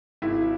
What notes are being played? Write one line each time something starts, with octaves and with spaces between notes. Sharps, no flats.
G#1 E4